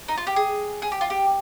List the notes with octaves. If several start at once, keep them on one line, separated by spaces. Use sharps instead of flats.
D#4
F4
G4
G#4
G#4
G4
F4
G4